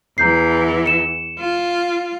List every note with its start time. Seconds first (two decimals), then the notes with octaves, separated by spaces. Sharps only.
0.18 E2 E3 A#5 G6 C7
0.86 C#7 E7
1.39 F4